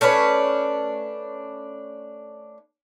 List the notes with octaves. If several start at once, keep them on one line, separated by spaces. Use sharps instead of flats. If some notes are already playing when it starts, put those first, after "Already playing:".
A3 C#4 D4 B4